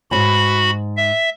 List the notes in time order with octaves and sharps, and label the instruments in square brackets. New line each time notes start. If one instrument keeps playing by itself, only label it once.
[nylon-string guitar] E2 G#2 [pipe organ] F#4 B5
[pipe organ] E5